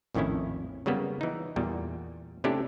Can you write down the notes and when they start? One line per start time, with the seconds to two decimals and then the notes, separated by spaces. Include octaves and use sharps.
0.15 A#1 F2 A2 D#3 C#4 E4
0.86 C#3 F#3 G3 A#3 B3
1.21 E3 D#4
1.56 E2 A#2 G3
2.44 C3 A3 C#4 D4 E4 G4